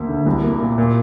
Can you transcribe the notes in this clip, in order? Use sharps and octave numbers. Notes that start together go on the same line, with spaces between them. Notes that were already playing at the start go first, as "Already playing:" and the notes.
Already playing: D2 A#3
D3
C2
A#3
A#2
A#2